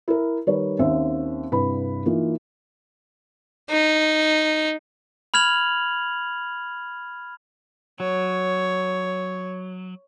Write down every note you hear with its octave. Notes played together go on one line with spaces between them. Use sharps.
E4 A#4
D#3 G3 A#4 B4 C#5
D#2 C4 C#4 C5 E5
C2 G2 B4 B5
E3 A#3 D#4 F4
D#4
B5 F6 G#6 F7 F#7
F#3 C#5